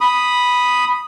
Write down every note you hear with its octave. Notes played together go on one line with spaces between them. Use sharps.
B5 D#6